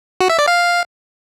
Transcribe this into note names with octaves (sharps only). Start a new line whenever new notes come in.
F#4
E5
D5
F5